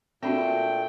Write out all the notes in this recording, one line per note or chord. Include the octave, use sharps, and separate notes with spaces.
A#2 A3 C4 D4 F#4 G5